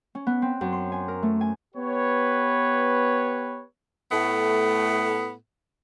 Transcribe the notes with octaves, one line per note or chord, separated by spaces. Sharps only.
C#4
B3
C4
F#2
C6
G#5
A#4
A3
G#5
B3 G4 B4 C#5
A2 A3 B3